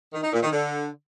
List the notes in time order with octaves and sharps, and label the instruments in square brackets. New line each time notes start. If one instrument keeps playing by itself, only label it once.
[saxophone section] D#3
D#4
A#2
D#3
D3